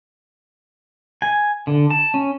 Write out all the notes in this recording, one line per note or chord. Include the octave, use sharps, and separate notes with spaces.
G#5
D3
A5
C#4